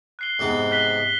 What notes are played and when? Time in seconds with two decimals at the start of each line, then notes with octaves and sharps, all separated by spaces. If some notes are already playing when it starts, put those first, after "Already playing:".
0.19 F#6 C7 G7
0.39 G#2 C3 B3
0.72 F#6 B6 G7